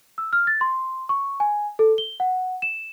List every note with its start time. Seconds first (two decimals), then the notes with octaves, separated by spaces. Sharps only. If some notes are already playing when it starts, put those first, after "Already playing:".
0.18 E6
0.33 F6
0.47 A6
0.61 C6
1.09 C#6
1.40 G#5
1.79 A4
1.98 G7
2.20 F#5
2.62 E7